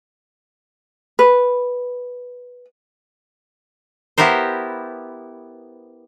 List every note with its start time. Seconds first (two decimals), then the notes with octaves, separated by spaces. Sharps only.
1.19 B4
4.18 B3 E4 G4 A#4 C5